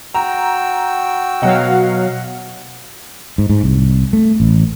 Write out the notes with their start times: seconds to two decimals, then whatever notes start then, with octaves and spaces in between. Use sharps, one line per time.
0.14 F#4 G5 A#5 E6
1.42 B2 F#3 D#5 F5 F#5
3.38 G#2
3.50 G#2
3.64 C2
4.13 A3
4.40 A1